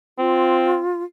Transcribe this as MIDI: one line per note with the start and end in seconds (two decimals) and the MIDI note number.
0.19 0.80 60
0.19 1.03 65